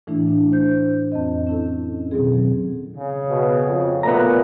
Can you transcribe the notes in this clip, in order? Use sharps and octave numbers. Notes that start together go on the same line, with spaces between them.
A2 E3 A3 D4 E4
D4
C5 G6
F2 C4 D#5
C#4 E4 A4
B2 D#3 F#3 C4 G#4
C#3
B2
F2
B1 A#2 A3 B3 B4 A#5